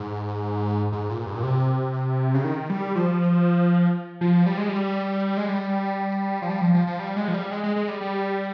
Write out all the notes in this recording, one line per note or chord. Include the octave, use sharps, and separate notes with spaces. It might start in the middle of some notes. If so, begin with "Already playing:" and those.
Already playing: G#2
G#2
A#2
G2
A#2
C3
C#3
D#3
G3
F3
F3
G3
G#3
G3
G#3
G3
F3
G3
F3
F3
F3
G3
G#3
F3
G3
G#3
G#3
G#3
G3
G3